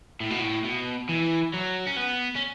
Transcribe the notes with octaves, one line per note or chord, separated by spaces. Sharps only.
A2
B2
A2
B2
E3
F#3
C#4
B3
C#4